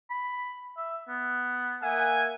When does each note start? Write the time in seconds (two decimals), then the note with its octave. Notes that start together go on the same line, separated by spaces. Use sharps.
0.10 B5
0.77 E5
1.09 B3
1.83 A#3 E5 F#5 G#5